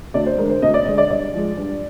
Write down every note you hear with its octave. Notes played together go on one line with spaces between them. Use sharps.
D2 D5
C5
D3 G#3 A#4
C5
D2 D#5
D5
D3 G#3 D#5
D5
G2 D5
F3 G#3
G2